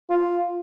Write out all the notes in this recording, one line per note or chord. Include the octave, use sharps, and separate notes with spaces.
F4